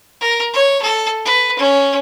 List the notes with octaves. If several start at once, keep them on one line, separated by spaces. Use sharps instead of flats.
A#4
C#5
A4
B4
C#4